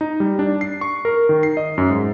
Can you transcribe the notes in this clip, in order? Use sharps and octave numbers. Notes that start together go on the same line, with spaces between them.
D#4
G3
D4
C7
C#6
A#4
D#3
C7
D#5
F#2
G#2